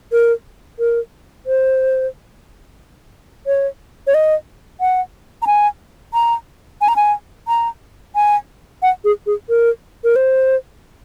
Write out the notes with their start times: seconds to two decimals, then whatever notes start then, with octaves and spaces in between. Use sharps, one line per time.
0.12 A#4
0.79 A#4
1.46 C5
3.47 C#5
4.07 C#5
4.14 D#5
4.81 F#5
5.42 A#5
5.47 G#5
6.14 A#5
6.81 G#5
6.88 A#5
6.96 G#5
7.48 A#5
8.16 G#5
8.82 F#5
9.04 G#4
9.26 G#4
9.49 A#4
10.04 A#4
10.16 C5